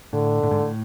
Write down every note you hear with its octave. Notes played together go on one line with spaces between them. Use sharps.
A2 D3
A2
G#2
A2